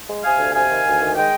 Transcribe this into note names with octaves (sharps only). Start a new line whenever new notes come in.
G#3
C3 F5 G#5
D2
C3 F5 G#5
D#3
D2
D#3
G#3 D#5 G5